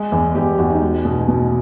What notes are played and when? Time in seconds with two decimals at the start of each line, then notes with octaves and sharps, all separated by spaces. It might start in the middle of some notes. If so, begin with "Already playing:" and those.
Already playing: G#3
0.12 E2
0.35 E2 G4
0.58 E2 F#4
0.70 D#4
0.82 G#3
1.05 B2
1.28 B2